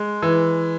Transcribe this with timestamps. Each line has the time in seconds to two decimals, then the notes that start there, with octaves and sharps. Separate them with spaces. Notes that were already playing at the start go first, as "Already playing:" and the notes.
Already playing: G#3
0.22 E3